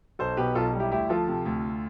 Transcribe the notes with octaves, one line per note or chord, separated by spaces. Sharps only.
B1 A4 C5
B2 G4 B4
B1 F4 A4
G3
E4 G4
D2 E4 G4
F3 F4 A4
C3
D2